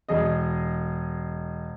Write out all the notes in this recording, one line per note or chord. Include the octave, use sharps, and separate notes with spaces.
E1 G#4 D#5